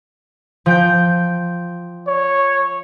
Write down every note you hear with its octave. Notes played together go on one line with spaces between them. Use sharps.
F3 G5 G6
C#5